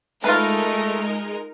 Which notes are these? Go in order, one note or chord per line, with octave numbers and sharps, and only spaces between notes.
G#3 A3 D#4 F4 A#4 B4